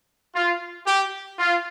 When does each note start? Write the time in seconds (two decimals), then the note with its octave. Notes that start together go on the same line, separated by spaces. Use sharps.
0.34 F4
0.86 G4
1.39 F4